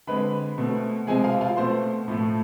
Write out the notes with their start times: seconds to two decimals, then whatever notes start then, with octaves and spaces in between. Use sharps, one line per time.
0.07 D3 G#3 C4 B4 B5
0.58 B2 A3 C4
1.07 C3 F3 G#3 C4 G#4 G#5
1.24 F4 F5
1.41 F4 F5
1.57 B2 A3 C4 C5 C6
2.08 A2 F3 A3